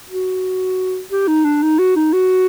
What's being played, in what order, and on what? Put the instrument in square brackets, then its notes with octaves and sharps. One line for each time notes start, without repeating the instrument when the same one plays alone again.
[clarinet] F#4
G4
D#4
D4
D#4
F#4
D#4
F#4